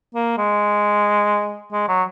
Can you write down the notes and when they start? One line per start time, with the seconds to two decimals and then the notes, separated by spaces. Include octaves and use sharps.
0.15 A#3
0.38 G#3
1.72 G#3
1.88 F#3